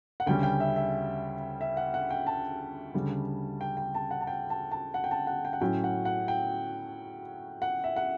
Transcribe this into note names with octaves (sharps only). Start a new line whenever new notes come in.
F#5
D2 C#3 G3 C#4 G5
G5
E5
E5
E5
F#5
F#5
G5
A5
D2 C#3 G3
G5
G5
A5
F#5
A5
G5
A5
A5
F#5
G5
A5
F#5
G5
F#5
A2 F#3 C#4 G5
F#5
F#5
G5
F#5
E5
F#5